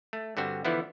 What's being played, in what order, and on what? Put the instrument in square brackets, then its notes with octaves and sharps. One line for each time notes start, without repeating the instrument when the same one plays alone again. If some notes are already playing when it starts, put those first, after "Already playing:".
[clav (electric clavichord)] A3
G2 D3 C4 F#4
D3 E3 F3 B3 E4